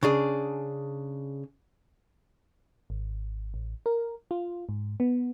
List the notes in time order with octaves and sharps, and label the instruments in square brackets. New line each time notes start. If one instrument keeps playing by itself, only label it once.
[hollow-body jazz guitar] C#3 D4 G#4
[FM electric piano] G#1
A1
A#4
F4
G#2
B3